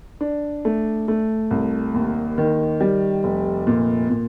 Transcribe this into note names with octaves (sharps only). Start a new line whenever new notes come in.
D4
A3
A3
C2
D#2
D#3
G3
F1
A#2
A#2